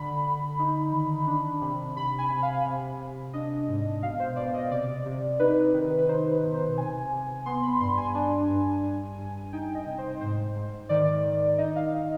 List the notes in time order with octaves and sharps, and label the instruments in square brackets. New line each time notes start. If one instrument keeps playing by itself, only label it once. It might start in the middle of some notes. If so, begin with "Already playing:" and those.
Already playing: [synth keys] D3 B5
D3
D#4
D#3
D4 B5
C3
C3 B5
G#5
C3
F5
C3
C3
D4 D#5
G#2
B2 F5
C5
B2 D5
D#5
C3 D5
C3
D#4 B4
D#3
B4
D#4 C5
B4
B2
C5
C3 G#5
C3
B3 C6
B5
G2 C6
G#5
D4
G2
G2
G2
D#4 G5
D#5
C3
C5
G#2 C5
G#2
D#3 D5
D#3
D#4 D#5
F5
D#3